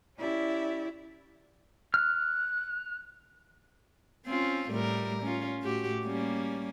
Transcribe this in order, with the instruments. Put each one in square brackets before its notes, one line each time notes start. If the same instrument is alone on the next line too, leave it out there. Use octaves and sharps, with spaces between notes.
[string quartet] C#4 E4 G4 D5 E5
[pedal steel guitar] F6 [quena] F#6
[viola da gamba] C4 C#4 F4
A2 G3 A#4
C#4 F4
A2 F#4 G4
G3 A#3 C#4